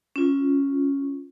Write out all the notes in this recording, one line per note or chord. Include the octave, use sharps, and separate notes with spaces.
C#4 F4